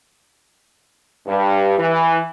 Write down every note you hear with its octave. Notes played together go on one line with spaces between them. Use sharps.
G2
E3